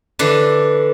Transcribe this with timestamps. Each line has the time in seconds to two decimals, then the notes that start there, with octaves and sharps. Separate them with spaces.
0.19 D3 E3